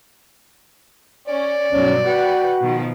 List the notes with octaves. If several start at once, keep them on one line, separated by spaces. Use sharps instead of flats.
C#4 D5
B1 G2 F#3 C#4
F#4 B4 F#5 G5
B2 D#3 F3